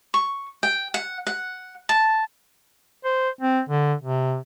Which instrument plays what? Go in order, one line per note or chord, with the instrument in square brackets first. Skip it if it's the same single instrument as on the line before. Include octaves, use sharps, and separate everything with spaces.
[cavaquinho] C#6
G5
F#5
F#5
A5
[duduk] C5
C4
D3
C3